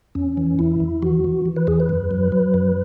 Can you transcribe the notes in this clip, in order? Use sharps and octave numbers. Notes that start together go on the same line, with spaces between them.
E2 C#4
E3
E2 E4
E2
E3 F#4
E3
E3
B4
E2 G#4
B4
F#2
F#3
F#3
F#2